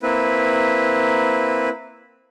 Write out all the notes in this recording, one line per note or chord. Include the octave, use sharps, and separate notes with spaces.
A#3 C4 E4 B4